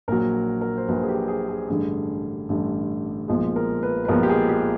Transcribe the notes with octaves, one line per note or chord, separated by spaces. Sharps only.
A#1 A#2 F#3 A#4
A#4
C5
A#1 A#2 F#3 B4
G#4
G4
G#4
G#4
A1 G2 D3 G3 G#4
A1 G2 D3 G3
B1 A#2 F3 G#3
A#4
B4
B4
B1 A#2 F3 G#3 A#4
G4
G#4
G4